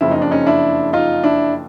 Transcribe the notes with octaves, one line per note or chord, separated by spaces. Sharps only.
F#1 F2 C#3 F3 E4
D#4
D4
C#4 D#4
D4 E4
D#4 F4
D4 E4